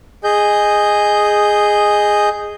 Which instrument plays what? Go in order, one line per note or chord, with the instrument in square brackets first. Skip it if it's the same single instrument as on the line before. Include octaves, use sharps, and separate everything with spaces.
[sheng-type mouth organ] G#4 D#5 G6